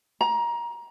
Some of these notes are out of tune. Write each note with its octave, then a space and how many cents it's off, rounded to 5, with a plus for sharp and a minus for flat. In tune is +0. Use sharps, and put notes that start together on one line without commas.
A#5 +25